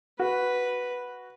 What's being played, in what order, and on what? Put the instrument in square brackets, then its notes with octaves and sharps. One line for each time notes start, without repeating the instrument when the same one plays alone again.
[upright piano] F#4 [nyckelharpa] B4